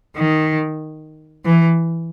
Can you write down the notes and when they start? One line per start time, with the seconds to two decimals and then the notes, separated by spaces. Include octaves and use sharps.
0.16 D#3
1.45 E3